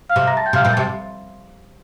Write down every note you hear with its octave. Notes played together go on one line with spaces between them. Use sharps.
F5 F6
C3
A#5 A#6
A5 A6
G5 G6
C3 F5 F6
A#2 G5 G6
C3 A5 A6